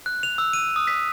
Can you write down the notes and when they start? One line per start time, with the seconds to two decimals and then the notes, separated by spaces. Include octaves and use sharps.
0.06 F#6
0.23 F7
0.38 E6
0.53 D#7
0.76 D#6
0.87 B6